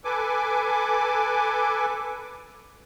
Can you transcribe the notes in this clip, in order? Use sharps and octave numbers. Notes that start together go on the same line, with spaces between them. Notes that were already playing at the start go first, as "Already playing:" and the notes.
A4 B4 G#5 D6